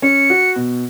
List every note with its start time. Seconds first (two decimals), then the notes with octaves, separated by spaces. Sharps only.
0.02 C#4 C#7
0.30 F#4
0.56 B2